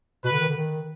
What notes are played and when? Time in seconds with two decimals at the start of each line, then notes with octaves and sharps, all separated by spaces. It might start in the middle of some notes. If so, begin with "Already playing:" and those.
0.24 B2 B4
0.33 D3
0.41 D#3
0.49 D3
0.57 D#3